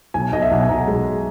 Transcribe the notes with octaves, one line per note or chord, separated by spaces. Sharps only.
B1 G#5
B1 D#5
E5
B1 F#5
G#5
B1 A#5
G#3